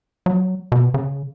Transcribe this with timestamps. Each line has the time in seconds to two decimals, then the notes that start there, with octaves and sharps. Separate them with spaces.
0.26 F#3
0.72 B2
0.94 C#3